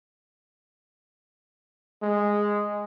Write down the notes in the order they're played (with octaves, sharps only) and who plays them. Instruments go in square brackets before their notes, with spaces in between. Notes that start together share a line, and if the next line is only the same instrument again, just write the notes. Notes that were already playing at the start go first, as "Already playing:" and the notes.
[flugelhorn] G#3